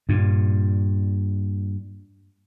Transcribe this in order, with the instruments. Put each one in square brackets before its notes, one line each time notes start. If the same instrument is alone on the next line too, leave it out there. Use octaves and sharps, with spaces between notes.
[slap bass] G2 A#2